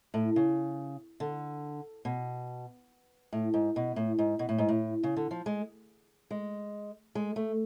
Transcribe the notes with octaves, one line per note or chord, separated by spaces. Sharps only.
A2
C#3
D3
B2
A2
G#2
B2
A2
G#2
B2
A2
G#2
A2
C#3
D3
F3
G#3
G#3
G#3
A3